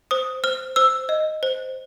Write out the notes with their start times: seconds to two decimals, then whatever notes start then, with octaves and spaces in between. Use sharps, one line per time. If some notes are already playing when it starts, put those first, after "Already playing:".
0.11 C5 D#6
0.44 C5 F6
0.76 C5 E6
1.09 D#5
1.43 C5